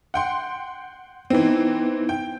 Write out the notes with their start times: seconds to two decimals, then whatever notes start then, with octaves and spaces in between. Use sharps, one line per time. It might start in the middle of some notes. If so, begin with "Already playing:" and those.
0.14 F#5 G5 C6
1.30 E3 B3 C4 D#4
2.09 G5